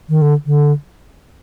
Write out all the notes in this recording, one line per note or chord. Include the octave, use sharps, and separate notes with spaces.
D#3
D3
D3